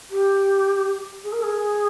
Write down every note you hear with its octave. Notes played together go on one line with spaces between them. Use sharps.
G4
G#4
A#4
G#4